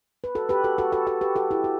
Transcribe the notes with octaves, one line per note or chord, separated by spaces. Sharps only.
B4
F#4 A4
G4 B4
F#4 A4
F#4 A4
F#4 A4
F#4 A4
G4 B4
F#4 A4
E4 G4
F#4